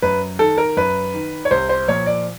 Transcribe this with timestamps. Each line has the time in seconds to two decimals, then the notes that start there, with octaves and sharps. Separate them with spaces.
0.02 F#2 B4
0.39 D#3 A4
0.58 A#4
0.77 F#2 B4
1.13 D#3
1.45 C#5
1.51 C2 C5
1.69 C5
1.88 A#2 F3 C#5
2.06 D5